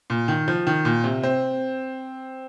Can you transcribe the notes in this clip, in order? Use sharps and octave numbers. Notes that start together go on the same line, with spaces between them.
A#2
D#3
F3
D#3
A#2
C3
C4